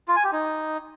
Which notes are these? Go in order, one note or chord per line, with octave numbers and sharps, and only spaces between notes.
F4
G#5
G4
D#4